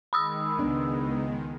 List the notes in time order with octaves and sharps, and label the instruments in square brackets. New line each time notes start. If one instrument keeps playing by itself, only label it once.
[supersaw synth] D#3 G#3 [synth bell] B5 D#6 E6
[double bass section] C#2 B3 [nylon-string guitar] D4